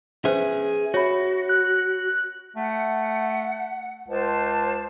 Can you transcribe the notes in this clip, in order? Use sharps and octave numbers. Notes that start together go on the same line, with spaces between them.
C#4 G#4 B4 C5 E5
F#4 C#5 E5 B5
F#6
A3 F#5
C#2 C5 A5